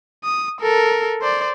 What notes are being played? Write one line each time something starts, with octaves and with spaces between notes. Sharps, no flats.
D#6
A4 A#4
C5 D5